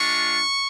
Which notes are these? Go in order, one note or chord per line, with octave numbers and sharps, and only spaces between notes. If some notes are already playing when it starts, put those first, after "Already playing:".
Already playing: G#3 D4 F4 C#6